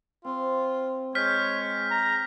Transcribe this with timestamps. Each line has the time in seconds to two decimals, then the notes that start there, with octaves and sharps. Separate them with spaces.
0.25 C4 F4
1.15 G#3 C#5 F6 G6 B6
1.91 A#5